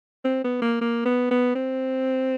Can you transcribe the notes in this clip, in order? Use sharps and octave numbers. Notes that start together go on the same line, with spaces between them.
C4
B3
A#3
A#3
B3
B3
C4